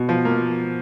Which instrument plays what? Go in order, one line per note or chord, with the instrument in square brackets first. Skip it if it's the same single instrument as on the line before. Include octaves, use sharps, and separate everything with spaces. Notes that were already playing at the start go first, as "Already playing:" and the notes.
Already playing: [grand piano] B2
F3
A#3